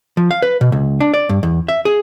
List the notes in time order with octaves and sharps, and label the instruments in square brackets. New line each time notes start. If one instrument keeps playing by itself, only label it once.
[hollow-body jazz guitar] F3
F5
B4
B2
C#2
D4
D5
G2
E2
E5
G#4